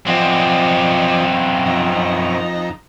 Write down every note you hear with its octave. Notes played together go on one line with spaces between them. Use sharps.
F#2 F3 C4 D5 D#5
F2 D#4 A#5